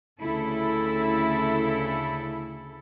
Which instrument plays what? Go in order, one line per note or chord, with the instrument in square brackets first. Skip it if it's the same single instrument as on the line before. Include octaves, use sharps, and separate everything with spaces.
[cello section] D2 C#3 E4 A4